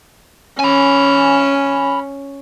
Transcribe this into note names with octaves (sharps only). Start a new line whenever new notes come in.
C#4 G#5 B5